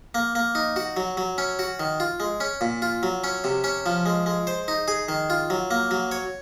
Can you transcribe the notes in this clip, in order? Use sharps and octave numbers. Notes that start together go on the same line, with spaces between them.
A#3
A#3
D#4
F#4
F#3
F#3
C#4
F#4
D#3
F4
G#3
C#4
A#2
F4
F#3
C#4
C3
C#4
F3
G#3
G#3
C5
D#4
G#4
D#3
F4
F#3
A#3
F#3
C#5